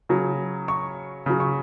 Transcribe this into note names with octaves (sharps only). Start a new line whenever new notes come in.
C#3 F#3
C#6
C#3 F#3
C#6